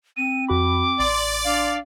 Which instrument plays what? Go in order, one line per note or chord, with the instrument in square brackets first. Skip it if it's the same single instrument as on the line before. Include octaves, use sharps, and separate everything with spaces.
[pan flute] C4 [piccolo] D#7
[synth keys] F2 F#4 B5 [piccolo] D6
[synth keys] A1 C6 [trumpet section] D5
[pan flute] D4 [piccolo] F5